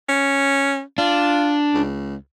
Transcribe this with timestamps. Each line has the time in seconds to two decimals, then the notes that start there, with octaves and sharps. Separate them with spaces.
0.09 C#4
0.98 D4 F4
1.74 C#2